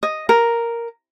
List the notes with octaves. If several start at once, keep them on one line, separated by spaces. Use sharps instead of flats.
D#5
A#4